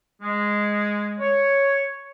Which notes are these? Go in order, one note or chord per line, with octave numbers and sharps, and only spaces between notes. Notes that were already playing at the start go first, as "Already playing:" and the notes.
G#3
C#5